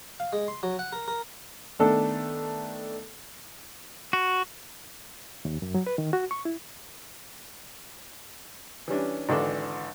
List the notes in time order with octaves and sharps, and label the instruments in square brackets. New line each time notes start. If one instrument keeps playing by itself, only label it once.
[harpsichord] F5
G#3
C6
F#3
F#5
A#4
A#4
[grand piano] D#3 A3 B3 D4 A4
[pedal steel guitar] F#4
[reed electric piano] D#2
F#2
F#3
B4
D#3
F#4
C#6
E4
[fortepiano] E3 G3 C#4 D4
G#1 D3 E3 A4 D5